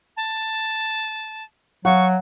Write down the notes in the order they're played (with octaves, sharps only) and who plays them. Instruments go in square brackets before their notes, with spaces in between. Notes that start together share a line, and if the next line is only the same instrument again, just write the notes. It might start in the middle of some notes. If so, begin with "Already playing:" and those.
[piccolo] A5
[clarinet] F#3 [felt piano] F5 F#5 [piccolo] C#6